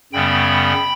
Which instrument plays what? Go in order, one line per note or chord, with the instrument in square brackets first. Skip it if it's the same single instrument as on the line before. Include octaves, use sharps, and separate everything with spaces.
[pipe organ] F#2 C#3 G3 B3 G5 B5